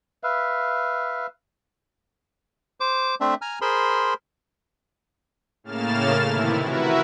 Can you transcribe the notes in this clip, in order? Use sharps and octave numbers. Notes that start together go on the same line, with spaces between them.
B4 E5 F5
C5 D6
A3 C4 D4 E5
G#5 A#5 F6
G#4 A#4 C5 B5 C6
A2 C#3 A#3 F6 A6 E7
A2 C3 D#3 E3 E4
E4 F#4 A#4 B4 E5